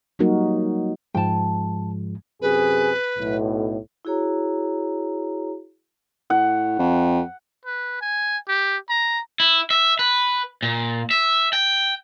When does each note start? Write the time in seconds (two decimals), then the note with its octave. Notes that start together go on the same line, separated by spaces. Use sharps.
0.19 F#3 G3 A#3 D#4 F#4 A#4
1.14 G#2 F3 G#3 G5 A5
2.42 F#2 C3 G#4 B4
3.18 B1 A2
4.05 E4 F#4 G#4 C#5 A#5
6.30 A2 F#5
6.79 F2
7.65 B4
8.01 G#5
8.48 G4
8.89 A#5
9.40 E4
9.71 E5
9.99 B4
10.63 A#2
11.11 E5
11.53 G5